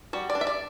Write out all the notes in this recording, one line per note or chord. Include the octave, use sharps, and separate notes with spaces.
G3 F#4
D5
D4
E5
D5